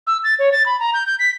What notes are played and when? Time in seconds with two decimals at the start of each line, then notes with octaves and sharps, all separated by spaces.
0.07 E6
0.24 A6
0.39 C#5
0.52 A6
0.66 B5
0.80 A#5
0.94 G6
1.06 G6
1.19 B6